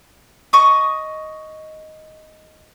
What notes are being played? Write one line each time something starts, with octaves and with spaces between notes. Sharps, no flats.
D#5 C#6 D#6